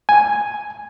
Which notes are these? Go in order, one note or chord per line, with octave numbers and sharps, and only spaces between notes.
G#5